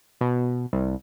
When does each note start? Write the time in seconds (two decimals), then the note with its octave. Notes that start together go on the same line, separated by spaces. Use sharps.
0.21 B2
0.73 C2